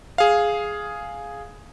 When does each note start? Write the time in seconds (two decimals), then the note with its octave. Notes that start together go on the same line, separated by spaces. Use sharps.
0.18 G#4 F5